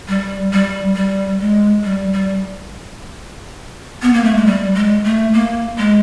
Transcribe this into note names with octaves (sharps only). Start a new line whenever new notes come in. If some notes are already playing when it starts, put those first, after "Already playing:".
G3
G3
G3
G#3
G3
G3
B3
A#3
A3
G#3
G3
G#3
A3
A#3
G#3